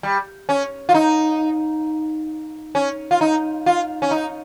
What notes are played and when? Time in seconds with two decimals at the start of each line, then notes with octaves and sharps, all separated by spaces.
0.03 G3
0.49 C#4
0.89 F4
0.94 D#4
2.75 C#4
3.11 F4
3.21 D#4
3.66 F4
4.02 C#4
4.11 D#4